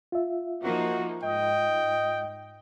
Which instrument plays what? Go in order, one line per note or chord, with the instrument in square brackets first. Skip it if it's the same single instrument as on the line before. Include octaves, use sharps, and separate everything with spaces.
[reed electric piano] F4 E5
[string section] F3 A#3 D#4 [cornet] F#4
[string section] G#2 [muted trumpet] D#5 [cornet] G5